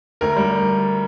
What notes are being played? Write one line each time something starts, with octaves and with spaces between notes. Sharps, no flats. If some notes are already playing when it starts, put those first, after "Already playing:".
D2 A#4
G3